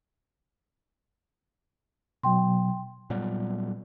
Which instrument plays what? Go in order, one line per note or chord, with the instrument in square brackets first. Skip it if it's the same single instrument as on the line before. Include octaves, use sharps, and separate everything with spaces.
[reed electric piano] B2 F#3 [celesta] G5 C6
[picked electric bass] A#2 F#3 G3 B3